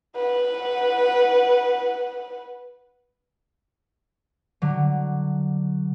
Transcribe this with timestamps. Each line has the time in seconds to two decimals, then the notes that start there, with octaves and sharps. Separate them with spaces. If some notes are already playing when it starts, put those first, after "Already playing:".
0.16 B4 F#5
4.62 D3 F#3